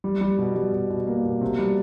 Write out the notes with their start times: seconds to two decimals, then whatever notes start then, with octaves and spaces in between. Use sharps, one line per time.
0.04 G3
0.21 G3
0.38 B2
0.56 G3
0.73 B2
0.90 B2
1.07 A#3
1.25 B2
1.41 C3
1.59 G3